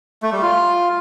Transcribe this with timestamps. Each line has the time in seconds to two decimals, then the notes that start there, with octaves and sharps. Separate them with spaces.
0.22 A3
0.32 G3
0.42 F4